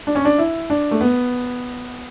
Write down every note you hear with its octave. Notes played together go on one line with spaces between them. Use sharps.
D4
C#4
D4
E4
D4
A3
B3